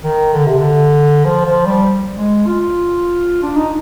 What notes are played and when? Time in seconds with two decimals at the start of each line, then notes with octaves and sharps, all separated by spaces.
0.03 D#3
0.33 D3
0.46 C3
0.58 D3
1.25 F3
1.46 F3
1.65 G3
2.16 G#3
2.46 F4
3.42 D4
3.56 D#4